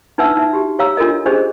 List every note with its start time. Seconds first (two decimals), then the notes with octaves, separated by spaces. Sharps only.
0.18 D4 D#4 B4 E5 F#5 E6
0.37 D#4 E5
0.53 F#4 G4
0.79 G4 C#5 F5 A#5 E6
0.97 D4 F4 A4 A#4 D#5
1.26 C#4 D4 G4 G#4 C5 D#5